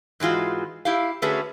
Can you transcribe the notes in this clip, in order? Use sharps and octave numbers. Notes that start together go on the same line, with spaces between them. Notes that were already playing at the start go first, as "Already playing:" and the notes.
G#2 E3 G#3 F4 F#4
E4 G4 F5
D3 A3 C#4 F#4 G#4 B4